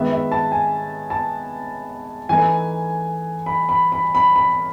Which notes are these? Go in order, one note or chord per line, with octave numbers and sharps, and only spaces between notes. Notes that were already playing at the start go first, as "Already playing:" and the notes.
Already playing: D#3 G#3 B3 E5
E5
A5
G#5
A5
E3 A3 D#4 G#5
B5
B5
B5
B5
B5